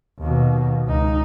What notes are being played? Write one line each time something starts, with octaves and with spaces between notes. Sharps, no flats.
D#2 B2
C#2 D#4